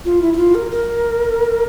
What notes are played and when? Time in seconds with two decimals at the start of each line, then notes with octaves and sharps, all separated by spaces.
0.05 F4
0.22 E4
0.33 E4
0.37 F4
0.55 A#4
0.71 A#4